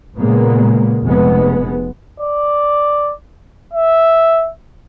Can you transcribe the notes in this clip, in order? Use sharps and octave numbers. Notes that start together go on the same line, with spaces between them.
A#2 C#3 G#3 A#3 B3
F1 G#3 B3
D5
E5